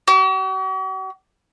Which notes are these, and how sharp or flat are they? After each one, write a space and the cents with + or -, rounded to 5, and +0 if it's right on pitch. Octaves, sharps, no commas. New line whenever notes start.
F#4 +45